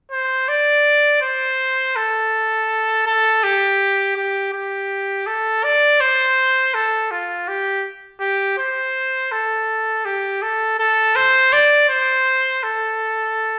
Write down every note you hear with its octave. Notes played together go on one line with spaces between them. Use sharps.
C5
D5
C5
A4
A4
G4
G4
G4
A4
D5
C5
A4
F4
G4
G4
C5
A4
G4
A4
A4
C5
D5
C5
A4